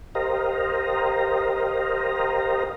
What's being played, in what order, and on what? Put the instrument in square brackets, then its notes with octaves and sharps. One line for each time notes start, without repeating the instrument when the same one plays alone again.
[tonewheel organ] G4 A#4 C5 D#5 F5 A#5